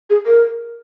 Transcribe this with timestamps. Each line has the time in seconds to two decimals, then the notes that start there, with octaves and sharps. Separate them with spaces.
0.10 G#4
0.26 A#4